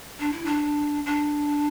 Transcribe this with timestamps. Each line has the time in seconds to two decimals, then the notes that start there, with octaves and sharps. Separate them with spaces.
0.19 D4
0.32 E4
0.45 D4
1.06 D4